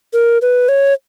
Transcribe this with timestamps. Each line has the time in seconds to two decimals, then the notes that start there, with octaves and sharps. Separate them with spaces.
0.13 A#4
0.42 B4
0.69 C#5